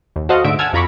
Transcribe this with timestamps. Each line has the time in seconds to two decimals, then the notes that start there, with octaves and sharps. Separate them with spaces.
0.16 D#2
0.29 F#4 A4 C5 D#5 F5 F#5
0.44 G#2 D3 A3 E5 D7
0.59 F#5 G#5 A5 E6 F6 G#6
0.73 F2 F4 A#5 B5 C#6 D6